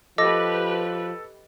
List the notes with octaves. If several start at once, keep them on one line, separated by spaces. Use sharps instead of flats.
F3 G4 A4 B4 D#5 D6 A#6